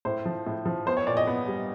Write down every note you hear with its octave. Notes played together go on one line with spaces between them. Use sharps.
A2 C5
F3
A2
F3
B3 C5
C#5
A#2 D5
D#5
B3
G3